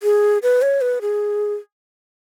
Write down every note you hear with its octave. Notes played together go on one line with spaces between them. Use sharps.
G#4
B4
C#5
B4
G#4